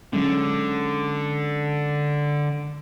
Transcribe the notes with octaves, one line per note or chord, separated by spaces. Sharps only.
D3 F#3 G#3 C#4